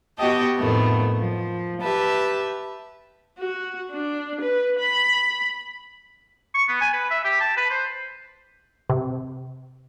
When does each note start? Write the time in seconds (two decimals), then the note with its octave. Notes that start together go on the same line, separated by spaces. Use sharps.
0.18 B3 F#4 G4 D#5 G5 A5
0.58 F2 A2 D#3 A3 B3
1.19 F3
1.82 G4 B4 E5 A5
3.38 F#4
3.91 D4
4.41 B4
4.79 B5
6.54 C#6
6.68 B3
6.81 G#5
6.93 B4
7.11 E5
7.24 G4
7.40 A5
7.57 B4
7.70 C5
8.90 C3